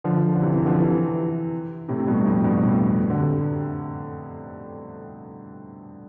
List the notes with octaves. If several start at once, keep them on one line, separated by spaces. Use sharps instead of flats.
D3 F3
D3
C3 E3
C3 E3
D3 F3
C3 E3
A2 C3
C3
G2 B2
F2 A2
G2 B2
F2 A2
D3
C3